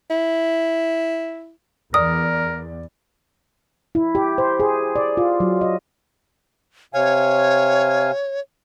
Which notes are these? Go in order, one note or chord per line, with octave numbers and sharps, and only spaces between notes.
E4
E2 A#4 D5 D#6
E4
G4
C5
G#4
D5
F4
F#3
D#5
C3 C#5 F5 G#5